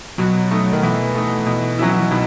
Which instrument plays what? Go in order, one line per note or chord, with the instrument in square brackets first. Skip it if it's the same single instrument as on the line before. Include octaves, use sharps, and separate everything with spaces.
[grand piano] B2 [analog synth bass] F#3
[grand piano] A3 D#4
[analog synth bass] D#3
[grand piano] B2 [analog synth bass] E3
[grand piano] A3 D#4
B2
F#3 C#4 E4
[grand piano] B2 [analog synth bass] D#3